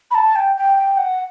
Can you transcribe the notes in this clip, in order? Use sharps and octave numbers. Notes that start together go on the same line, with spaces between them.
B5
A5
G5
G5
G5
F#5